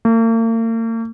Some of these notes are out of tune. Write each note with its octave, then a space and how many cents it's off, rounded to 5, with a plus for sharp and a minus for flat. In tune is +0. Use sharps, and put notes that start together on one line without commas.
A#3 -45